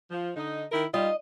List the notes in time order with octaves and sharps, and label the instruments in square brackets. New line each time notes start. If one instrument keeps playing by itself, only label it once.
[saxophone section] F3
D3 D#4
D#3 E4 A#4
[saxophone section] G3 D#4 F4 [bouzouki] D#5